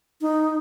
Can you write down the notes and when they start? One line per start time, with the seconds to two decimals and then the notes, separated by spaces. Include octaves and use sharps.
0.21 D#4